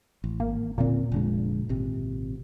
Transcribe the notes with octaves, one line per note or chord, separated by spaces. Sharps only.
A1
G#1 A#3
E1 A#2 D3 C4
F1 D3 G#3
G#1 C3